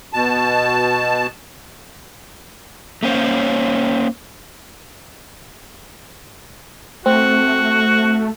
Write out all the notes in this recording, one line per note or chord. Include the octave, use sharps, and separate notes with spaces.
B2 A5
A3 A#3 C#4 C5 C#5 F5
A3 C4 F#4